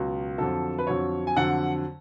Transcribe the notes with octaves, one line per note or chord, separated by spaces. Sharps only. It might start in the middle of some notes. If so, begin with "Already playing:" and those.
Already playing: C#2 B2 F#3
F2 D3 F#3 A4
B4
F2 D3 F#3 C#5
G#5
F2 D3 F#3 F#5